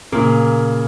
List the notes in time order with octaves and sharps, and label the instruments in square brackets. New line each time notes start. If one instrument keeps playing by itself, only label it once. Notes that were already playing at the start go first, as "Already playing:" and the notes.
[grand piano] A#2 C#3 [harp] A#3